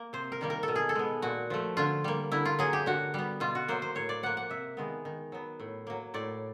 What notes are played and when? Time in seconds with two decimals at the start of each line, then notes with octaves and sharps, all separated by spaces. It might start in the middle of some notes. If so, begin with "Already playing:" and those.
Already playing: A#3
0.13 C3 C5
0.32 A#4
0.41 D#3 G3 A#3
0.50 A#4
0.63 A4
0.68 B2
0.75 G#4
0.89 A4
0.95 G#3 B3
1.22 A#2 F#4
1.50 F3 A3
1.77 D3 F4
2.04 G3 A#3
2.32 D3 E4
2.45 F4
2.59 F#3 A#3 G#4
2.73 G4
2.86 D3 F#4
3.14 G3 B3
3.40 B2 F4
3.55 F#4
3.68 F#3 A#3 C5
3.82 C5
3.95 A2 C#5
4.09 D5
4.23 F3 A#3 F#5
4.37 F#5
4.50 C3 E5
4.77 D#3 G#3 B3
5.05 D#3
5.32 F#3 B3
5.60 A2
5.87 F#3 A#3
6.14 A2 D5